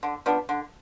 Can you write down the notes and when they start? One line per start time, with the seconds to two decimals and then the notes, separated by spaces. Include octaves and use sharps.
0.03 D3
0.26 F3 B3 D4
0.49 D3